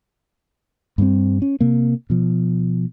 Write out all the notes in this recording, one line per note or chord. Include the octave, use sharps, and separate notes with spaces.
G2 G3 A#3 C4
C#4
C3 A#3
B2 F3